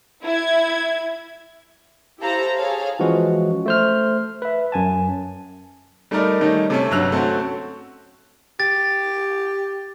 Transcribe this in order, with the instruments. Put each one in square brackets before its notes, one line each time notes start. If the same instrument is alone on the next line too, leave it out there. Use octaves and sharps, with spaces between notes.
[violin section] E4 G#6
[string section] E4 G4 A4 C5 F5 A#5
G#4 A4 C#5 F5
[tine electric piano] E3 F3 G#3 C#4 F#4
A3 C5 F6
B4 E5
F#2 G#5 A5
[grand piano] G3 A3 D#4 A#4 D5
D#3 G3 A3 C#4 D#4
C3 A3 C#4
G1 D3 F#3 E6 F#6 F7
A3 C4 C#4 F#4
[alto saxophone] G4 [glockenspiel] A6